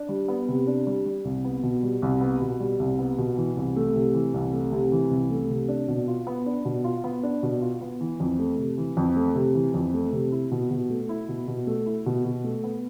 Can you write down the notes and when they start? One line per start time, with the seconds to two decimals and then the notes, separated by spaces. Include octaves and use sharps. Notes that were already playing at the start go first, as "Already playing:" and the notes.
Already playing: D4
0.09 G3
0.28 B3
0.48 C3
0.67 D4
0.87 G3
1.06 G3
1.25 C2
1.45 B3
1.63 B2
1.83 G3
2.02 C2
2.21 B3
2.41 B2
2.60 G3
2.79 C2
2.99 B3
3.18 B2
3.37 E3
3.57 C2
3.76 A3
3.96 C3
4.14 E3
4.34 C2
4.53 A3
4.72 C3
4.92 E3
5.11 C2
5.30 A3
5.50 C3
5.69 D4
5.88 B2
6.08 F4
6.27 B3
6.46 D4
6.65 B2
6.84 F4
7.04 B3
7.23 D4
7.43 B2
7.62 F4
7.81 B3
8.01 E3
8.20 F2
8.39 A3
8.58 C3
8.78 E3
8.97 F2
9.16 A3
9.35 C3
9.55 E3
9.74 F2
9.94 A3
10.12 C3
10.32 E4
10.51 B2
10.70 B2
10.90 A3
11.09 E4
11.28 B2
11.48 B2
11.67 A3
11.86 E4
12.06 B2
12.25 B2
12.44 A3
12.64 B3